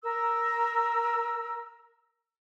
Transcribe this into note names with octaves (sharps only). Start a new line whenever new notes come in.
A#4 E6